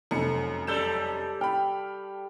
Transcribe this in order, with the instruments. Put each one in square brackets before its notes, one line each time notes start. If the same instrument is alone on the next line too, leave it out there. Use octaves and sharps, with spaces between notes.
[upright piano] F1 [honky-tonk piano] F#2 C#7
[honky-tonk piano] F#2 G6 E7 [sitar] G3 A4
[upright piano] G5 [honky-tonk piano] B5 F6